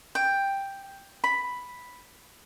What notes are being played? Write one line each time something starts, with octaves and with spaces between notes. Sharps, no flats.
G5
B5